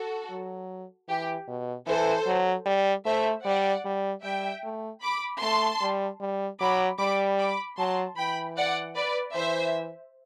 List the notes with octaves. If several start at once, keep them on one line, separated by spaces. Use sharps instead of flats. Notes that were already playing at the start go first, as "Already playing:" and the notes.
Already playing: F#4 A4
F#3
E3 G4
B2
E3 A4 C5
F#3
G3
A3 C5 E5
G3 D5 F#5
G3
G3 E5 G5
A3
B5 D6
A3 A5 C6
G3
G3
F#3 B5 D6
G3 B5 D6
B5 D6
F#3 A5 C6
E3 G5 B5
D5 F#5
B4 D5
E3 C5 E5